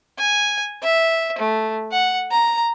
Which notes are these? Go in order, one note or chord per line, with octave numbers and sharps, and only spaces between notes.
G#5
E5
A3
F#5
A#5